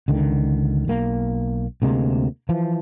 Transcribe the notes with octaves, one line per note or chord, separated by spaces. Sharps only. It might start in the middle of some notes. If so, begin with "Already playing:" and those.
C#2 D3 D#3
B1 A#3
D2 C3 G#3 A#3
E3 F3